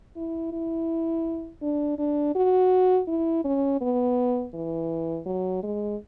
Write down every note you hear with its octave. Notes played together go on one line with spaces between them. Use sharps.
E4
E4
D4
D4
F#4
E4
C#4
B3
E3
F#3
G#3